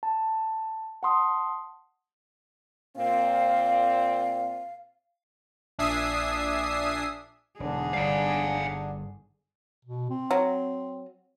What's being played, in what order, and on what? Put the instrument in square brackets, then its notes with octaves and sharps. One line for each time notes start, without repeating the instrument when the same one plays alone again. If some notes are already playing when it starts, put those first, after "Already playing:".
[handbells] A5
F#5 A5 C6 D#6
[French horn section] A#2 C4 [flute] F5
[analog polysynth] A#1 D4 E5 G#5 D#6 C7
[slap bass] E1 E2 [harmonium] D3 D4 [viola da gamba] D#4 G#4
[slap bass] G1 G3 [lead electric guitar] F5 G#5
[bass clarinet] B2
C4
[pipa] F#3